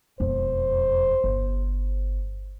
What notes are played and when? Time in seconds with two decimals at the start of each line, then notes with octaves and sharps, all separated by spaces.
0.20 E1 F2 C5
1.24 G1